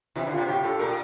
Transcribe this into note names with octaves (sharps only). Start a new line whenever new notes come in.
C3 E3 E4
D3
F4
C3
A2 G4
A2 A4
A#2 A#4